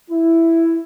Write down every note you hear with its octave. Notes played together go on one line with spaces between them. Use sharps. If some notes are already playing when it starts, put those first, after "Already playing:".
E4